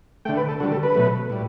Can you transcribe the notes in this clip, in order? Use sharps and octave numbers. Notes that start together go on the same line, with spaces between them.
D3 A3 G5
B4
A4
D3 G3 F#4
A4
B4
B2 F#3 A3
A2 G3